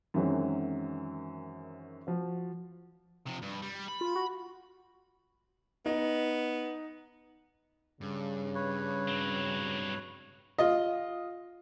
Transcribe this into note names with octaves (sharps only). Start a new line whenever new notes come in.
F#2 D#3 E3 F#3 G#3 C4
F3 F#4
C3 F3
G2
G3
B5
F4
F#4
B3 D#4
G2 C#3
B4 C#5
F#3 C4
F4 D#5